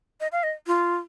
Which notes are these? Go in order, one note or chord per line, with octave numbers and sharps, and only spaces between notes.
D#5
F5
D#5
F4